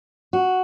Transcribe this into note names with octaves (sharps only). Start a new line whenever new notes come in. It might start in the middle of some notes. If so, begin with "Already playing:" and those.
F#4